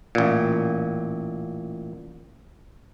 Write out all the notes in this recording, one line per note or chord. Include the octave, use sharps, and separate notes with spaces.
A1 A#2